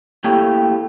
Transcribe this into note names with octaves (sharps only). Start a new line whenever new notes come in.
A3 A#3 E4 G4 C#5 G5